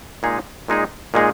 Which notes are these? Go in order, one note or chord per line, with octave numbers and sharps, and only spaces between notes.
A#2 G#3 D#4 G#4
A#2 G#3 D#4 G#4
A#2 G#3 D#4 G#4